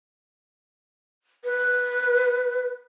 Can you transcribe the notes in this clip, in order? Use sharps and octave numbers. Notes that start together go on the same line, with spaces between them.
B4